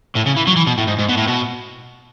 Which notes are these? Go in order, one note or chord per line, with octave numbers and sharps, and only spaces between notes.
A2
C#3
E3
F#3
E3
B2
A2
G#2
G#2
B2
A2
B2